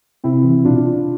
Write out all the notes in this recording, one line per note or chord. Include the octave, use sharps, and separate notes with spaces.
C3 C4 E4
E3
B2 D4 F4